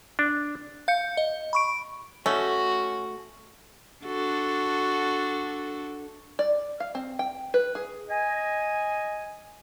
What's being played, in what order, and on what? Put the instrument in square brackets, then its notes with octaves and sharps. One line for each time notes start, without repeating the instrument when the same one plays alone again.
[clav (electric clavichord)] D4
[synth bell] F5 G6 C#7
D#5
B5 C#6 D7
[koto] A3 [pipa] C#4 [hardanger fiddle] F#4
[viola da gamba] D4 F#4 A4
[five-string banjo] D5
F5
C4
G5
B4
G#4
[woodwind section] D#5 G#5